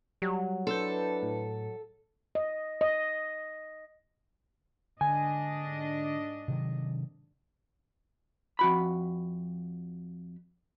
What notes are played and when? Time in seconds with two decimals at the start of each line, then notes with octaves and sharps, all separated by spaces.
0.22 F#3 G3
0.67 D4 E4 A4 B4 C6 E6 G6
1.22 A2
2.35 D#5
2.81 D#5
5.01 G#2 D3 D4 D#5 G#5
6.48 C3 D#3 F#3
8.59 F2 F#4 B5